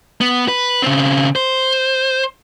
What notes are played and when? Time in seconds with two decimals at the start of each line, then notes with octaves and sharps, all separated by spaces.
0.21 B3
0.48 B4
0.82 C#3 C4
1.36 C5